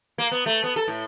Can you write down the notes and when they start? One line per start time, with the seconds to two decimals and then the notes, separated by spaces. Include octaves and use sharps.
0.18 A#3
0.31 B3
0.46 A3
0.64 B3
0.76 A4
0.88 A2